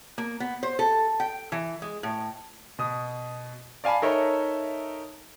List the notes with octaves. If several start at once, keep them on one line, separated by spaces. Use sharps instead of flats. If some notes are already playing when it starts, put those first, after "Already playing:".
A#3
B3
C5
A4
G5
E3
G#3
A2
B2 D#6
D5 F5 G#5 A5 B5
D#4 A4 A#4 C#5 E5